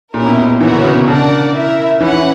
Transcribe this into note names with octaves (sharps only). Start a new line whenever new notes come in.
A#2 C#4 E4 G4 A#4
B2
B2
E3 B3 F#4 A#4 C#5
D3
C#3
B2
C#3 D4 A#4 D5 F#5
E4 A#4 E5
E3 C#4 E4 B4 F#5
E3